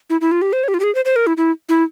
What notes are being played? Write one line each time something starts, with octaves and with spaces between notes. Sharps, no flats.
E4
E4
F4
G4
C5
C#5
G4
F4
G4
G#4
C5
C5
A#4
E4
E4
E4